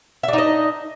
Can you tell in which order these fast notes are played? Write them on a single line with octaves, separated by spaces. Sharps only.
E5 D4 D#4 D#5